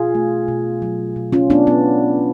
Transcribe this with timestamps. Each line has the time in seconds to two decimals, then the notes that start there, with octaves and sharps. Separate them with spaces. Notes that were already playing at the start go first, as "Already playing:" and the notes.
Already playing: B2 F4 G#4
0.15 A3
0.48 B2
0.82 F#3
1.16 B2
1.32 C#4 F4
1.50 A3 B3 D4
1.67 B3